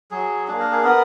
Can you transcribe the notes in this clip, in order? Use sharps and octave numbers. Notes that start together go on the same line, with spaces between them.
F#3 G#4
A#3 D4 G#4
A#4
G#4
B3 A#4